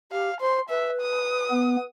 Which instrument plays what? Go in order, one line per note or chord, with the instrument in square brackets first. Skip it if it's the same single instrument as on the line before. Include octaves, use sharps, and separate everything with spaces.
[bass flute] G4 [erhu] F5
[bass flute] C5 [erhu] C6
[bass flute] B4 [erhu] E5
[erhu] D#6
[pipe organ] B3